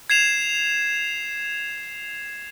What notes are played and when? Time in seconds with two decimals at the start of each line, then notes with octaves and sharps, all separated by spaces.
0.10 G#6 C7 E7 F7